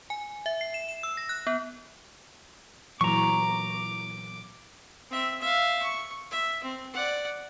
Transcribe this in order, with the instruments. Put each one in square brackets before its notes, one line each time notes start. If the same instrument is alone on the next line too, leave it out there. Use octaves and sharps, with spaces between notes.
[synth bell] G#5
E5
C7
E7
E7
E6
A#6
F#6
B3
[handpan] A#2 E3 F#3 [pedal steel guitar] A#5 C#6 [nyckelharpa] D6
[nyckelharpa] C4 E5
E5 F5
C#6
E5
C4
D5 F#5